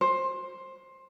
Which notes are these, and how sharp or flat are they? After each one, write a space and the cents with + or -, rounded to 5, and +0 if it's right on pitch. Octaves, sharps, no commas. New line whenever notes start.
C5 +15